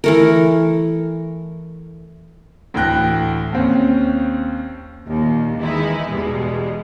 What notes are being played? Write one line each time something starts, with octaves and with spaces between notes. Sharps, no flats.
E3 A3 A#4
D2 A2 E3 G5 F#6 A#6
D#2 C4 C#4
D#2 A#2
D#3 E3 G#3 D#4 E4
E2 B2 G3 G#3